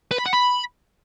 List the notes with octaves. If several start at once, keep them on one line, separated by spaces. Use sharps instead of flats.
B4
B5
F#5
B5